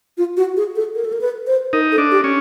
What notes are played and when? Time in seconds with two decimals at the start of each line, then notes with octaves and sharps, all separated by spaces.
0.18 F4
0.37 F#4
0.57 G#4
0.76 A4
0.95 A#4
1.05 A4
1.13 A#4
1.21 B4
1.47 C5
1.73 D#4 A#4
1.92 A4
1.98 D4
2.11 G4
2.24 C#4